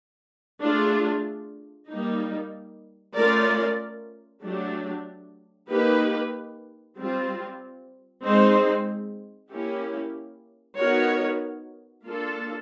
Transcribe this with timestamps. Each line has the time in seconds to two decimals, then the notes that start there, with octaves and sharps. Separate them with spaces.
0.62 A3 D4 F4 G#4
1.89 G3 A#3 D#4
3.16 A3 C#4 F4 A#4 D5
4.43 F#3 A3 D4 G4
5.70 A#3 D#4 G4 B4
6.97 G3 C4 F4
8.24 G#3 C4 D#4 G#4 C5
9.51 A#3 C#4 E4 G4
10.78 B3 D#4 F#4 A#4 C#5
12.05 A#3 D4 F4 A4